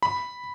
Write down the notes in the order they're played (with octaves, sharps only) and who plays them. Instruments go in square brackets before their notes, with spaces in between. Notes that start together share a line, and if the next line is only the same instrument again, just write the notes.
[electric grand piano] B5